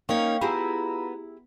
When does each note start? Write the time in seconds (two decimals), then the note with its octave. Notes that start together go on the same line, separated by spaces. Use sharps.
0.09 A#3 C#4 D#4 C#5 F5 G5 C#6
0.41 B3 E4 F4 G4 G#4 A#5 B5